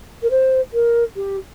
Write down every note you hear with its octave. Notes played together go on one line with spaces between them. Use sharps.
A#4
C5
A#4
G4